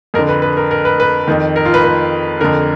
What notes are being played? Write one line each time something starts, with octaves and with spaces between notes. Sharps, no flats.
F2 D3 A#4
B4
B4
A#4
A#4
B4
B4
F2 D#3
A#4
F4
B4
B4
F2 D3 A#4